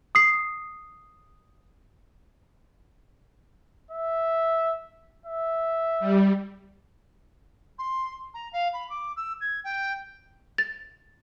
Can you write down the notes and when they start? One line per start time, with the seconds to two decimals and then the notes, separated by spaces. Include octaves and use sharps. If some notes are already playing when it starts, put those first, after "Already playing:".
0.15 D#6 C7
3.91 E5
5.26 E5
6.00 G3
7.79 C6
8.34 A#5
8.53 F5
8.73 B5
8.90 D6
9.17 E6
9.41 G#6
9.64 G5
10.58 A6